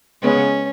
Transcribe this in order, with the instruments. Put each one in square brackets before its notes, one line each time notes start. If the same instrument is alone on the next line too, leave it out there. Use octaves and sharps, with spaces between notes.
[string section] C#3 G#3 B3 [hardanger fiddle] C#4